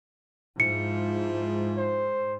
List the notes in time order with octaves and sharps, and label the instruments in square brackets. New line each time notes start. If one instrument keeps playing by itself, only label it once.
[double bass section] G#2 [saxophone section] F3 E4 F4 [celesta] C#7
[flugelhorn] C5